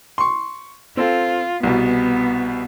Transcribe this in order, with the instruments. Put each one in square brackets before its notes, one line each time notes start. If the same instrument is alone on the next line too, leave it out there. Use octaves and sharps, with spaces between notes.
[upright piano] C6 C#6
[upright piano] C4 A4 [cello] F4
[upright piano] C2 B2 [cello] B3